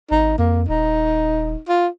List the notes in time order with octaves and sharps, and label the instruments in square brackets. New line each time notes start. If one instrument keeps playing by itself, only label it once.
[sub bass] G#1 [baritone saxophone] D#4
[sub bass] F2 [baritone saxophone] A#3
[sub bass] D#1 [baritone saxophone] D#4
[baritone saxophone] F4